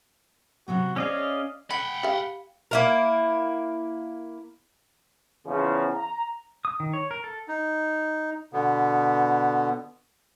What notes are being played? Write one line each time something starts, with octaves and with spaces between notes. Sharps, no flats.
C3 F#3 B3 F#4
C#4 G#4 C5 D5 D#5 F5
F#5 G5 B5
G4 F5
A#3 E4 A#4
E2 C#3 F3
A#5
D#6
D#3
C#5
A#4
A4
D#4
B2 D3 B3